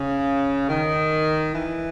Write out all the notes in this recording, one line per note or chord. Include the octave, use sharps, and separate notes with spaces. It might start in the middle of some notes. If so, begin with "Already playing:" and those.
Already playing: C#3
D#3
E3